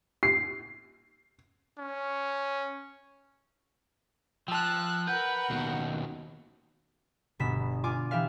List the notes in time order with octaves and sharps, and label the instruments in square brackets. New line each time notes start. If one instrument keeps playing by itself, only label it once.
[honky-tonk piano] C7
[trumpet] C#4
[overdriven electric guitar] F3 [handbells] G5 A5 [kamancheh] E6 F#6
[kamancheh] A#4 F#5 [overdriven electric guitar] B4 [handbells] G6
[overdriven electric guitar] D#2 B2
[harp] G1 B2 B3 B6 E7
F4 G#5 D6
E3 G4 E5 F5